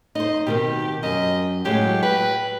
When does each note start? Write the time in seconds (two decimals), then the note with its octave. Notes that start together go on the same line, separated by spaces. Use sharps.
0.15 D#4 C5 D#5
0.47 B2 D#3 C4 G4
1.03 F#2 D#5
1.65 A2 F#3 G#3 G4
2.03 B4 G5